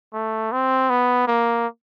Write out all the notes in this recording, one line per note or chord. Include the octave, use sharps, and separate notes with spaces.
A3
C4
B3
A#3